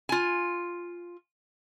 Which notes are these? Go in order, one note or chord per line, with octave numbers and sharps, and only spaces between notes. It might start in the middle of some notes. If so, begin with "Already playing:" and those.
F4 G#5